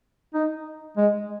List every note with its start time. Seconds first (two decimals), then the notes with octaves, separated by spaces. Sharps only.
0.35 D#4
0.97 G#3